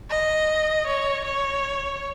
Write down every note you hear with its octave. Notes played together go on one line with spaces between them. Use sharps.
D#5
C#5
C#5